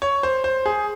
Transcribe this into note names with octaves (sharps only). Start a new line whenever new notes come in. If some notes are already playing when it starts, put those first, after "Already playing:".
C#5
C5
C5
G#4